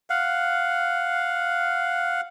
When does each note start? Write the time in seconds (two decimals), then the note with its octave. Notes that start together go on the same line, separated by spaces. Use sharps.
0.10 F5 F#5